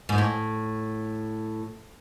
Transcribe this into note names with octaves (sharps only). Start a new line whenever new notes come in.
G#2
A2